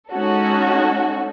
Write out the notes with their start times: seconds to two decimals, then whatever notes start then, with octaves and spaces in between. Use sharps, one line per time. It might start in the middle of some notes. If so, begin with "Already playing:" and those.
0.13 G#3 C#4 D#4 F#4 A4